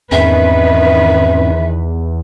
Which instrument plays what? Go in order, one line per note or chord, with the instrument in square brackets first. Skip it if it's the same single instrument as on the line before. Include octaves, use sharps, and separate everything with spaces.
[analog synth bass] E2 [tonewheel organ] G#2 C4 C#4 [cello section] D#3 B4 [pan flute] E5